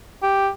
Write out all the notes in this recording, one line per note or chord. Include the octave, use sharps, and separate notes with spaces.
G4